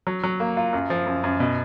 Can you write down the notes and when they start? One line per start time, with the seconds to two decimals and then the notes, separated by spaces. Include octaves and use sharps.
0.07 F#3
0.24 F#3
0.40 A#3
0.57 F4
0.73 F#2
0.90 F3
1.06 F#2
1.24 F#2
1.40 B2